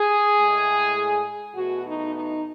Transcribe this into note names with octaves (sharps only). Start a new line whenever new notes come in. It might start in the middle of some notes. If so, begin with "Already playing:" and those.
Already playing: G#4
A2 G#3
E2 B2 A3 F#4
D#4
D#4